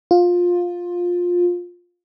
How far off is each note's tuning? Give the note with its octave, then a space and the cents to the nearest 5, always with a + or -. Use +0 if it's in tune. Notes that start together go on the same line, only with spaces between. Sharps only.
F4 +15